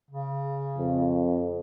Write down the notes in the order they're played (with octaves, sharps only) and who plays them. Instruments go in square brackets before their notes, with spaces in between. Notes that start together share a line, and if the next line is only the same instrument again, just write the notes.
[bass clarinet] C#3
[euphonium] F2